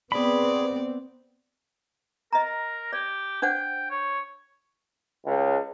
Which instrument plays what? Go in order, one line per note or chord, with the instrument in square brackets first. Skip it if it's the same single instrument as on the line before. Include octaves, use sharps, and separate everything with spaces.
[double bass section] B3 C4 [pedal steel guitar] G#4 B5 [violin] D5
[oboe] A#4 [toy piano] D#5 A#5
[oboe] G4 [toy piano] D5
[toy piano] D4 C5 F#5 [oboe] G5
[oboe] C#5
[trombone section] C#2